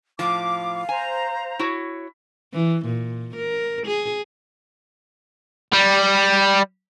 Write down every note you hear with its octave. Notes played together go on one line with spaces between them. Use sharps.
A2 F3 F5 D6
C5 G#5 A#5
E4 F#4 C#5
E3
A#2
A#4
G#4
G3